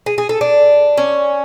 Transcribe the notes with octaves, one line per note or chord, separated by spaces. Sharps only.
G#4
G#4
A4
D4
C#4